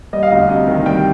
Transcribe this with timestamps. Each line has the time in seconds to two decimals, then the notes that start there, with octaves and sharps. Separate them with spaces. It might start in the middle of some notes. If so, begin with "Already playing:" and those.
0.13 G3 D#5
0.23 F5
0.31 D2 D#5
0.49 C3 D#5
0.68 D#3
0.86 G3 G5